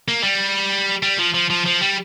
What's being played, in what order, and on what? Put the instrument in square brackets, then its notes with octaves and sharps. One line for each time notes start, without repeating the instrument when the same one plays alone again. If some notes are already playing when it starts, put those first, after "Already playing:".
[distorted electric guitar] A#3
G3
G3
F3
F3
F3
F3
G3